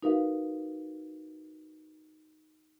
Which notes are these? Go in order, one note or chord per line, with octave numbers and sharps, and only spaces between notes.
D#4 F#4 A#4 B4 E5 F5